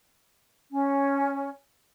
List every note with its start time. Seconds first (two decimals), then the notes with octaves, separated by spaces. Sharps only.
0.71 C#4